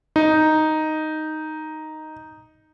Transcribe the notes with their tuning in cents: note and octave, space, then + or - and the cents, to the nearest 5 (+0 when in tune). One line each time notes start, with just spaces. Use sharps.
D#4 +0